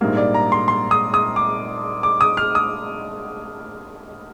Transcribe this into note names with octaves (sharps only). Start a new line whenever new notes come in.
A#1 G#2 G3 A#3
D5
A#5
C6
C6
D#6
D#6
D6
D6
D#6
F6
D#6